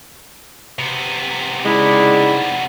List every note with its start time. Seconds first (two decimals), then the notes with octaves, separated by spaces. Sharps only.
0.79 C3 B3
1.65 C#3 G#3 D#4 E4 D5